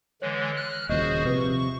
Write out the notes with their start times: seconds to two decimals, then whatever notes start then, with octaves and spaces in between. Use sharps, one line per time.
0.22 D3 E3 G#3 C#5
0.57 F6 F#6
0.89 D#1 A#2 C#3 F#4 G#4 C5 D#5
1.25 C3 F3 B4 C#6